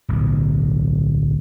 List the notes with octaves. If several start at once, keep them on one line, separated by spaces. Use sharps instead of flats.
D1 B1